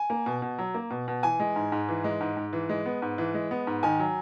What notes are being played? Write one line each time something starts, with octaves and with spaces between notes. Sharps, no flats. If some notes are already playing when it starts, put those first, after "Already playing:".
Already playing: G#5
A#3
B2
B2
F#3
A#3
B2
B2
E3 G#5
G#3
G#2
G#2
E3
G#3
G#2
G#2
E3
G#3
B3
G#2
E3
G#3
B3
G#2
D#3 G#5
F#3